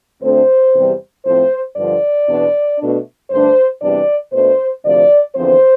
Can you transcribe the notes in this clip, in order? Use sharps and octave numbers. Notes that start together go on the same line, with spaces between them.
D2 D3 A3 C4 C5
E2 C3 G3
A2 F3 A3 C4 C5
G2 D3 F3 D5
E2 B2 B3 D4
B2 A3 D4
G2 D3 A3 D4 C5
E2 C3 E3 G3 D4 D5
B2 A3 D4 C5
D2 C3 F3 D5
E2 D3 F3 C4 C5